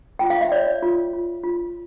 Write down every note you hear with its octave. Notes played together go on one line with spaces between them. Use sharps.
F4 G5
F5
E5
C#5 D5
F4
F4
F4